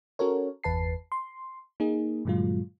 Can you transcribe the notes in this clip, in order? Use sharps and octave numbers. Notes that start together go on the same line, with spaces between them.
C#4 F#4 A4 A#4 C#5
G1 E2 B4 A5 C7
C6
A#3 D#4 G#4
G2 A#2 D3 F#3 G#3 F4